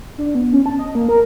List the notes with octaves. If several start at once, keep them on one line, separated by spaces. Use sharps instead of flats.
D4
B3
C#4
A5
D#5
A#3
A#4